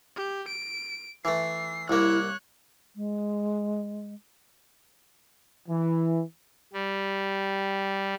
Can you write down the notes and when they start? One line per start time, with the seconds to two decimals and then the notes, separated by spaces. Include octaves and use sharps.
0.16 G4
0.48 D7
1.25 E3 A3 C7
1.89 C2 A#3 E4 C#5 F#6
2.96 G#3
5.69 E3
6.73 G3